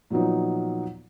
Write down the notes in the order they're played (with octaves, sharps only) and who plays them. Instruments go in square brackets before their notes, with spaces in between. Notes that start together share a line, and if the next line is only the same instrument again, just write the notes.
[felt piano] A#2 F3 F#3 B3 D#4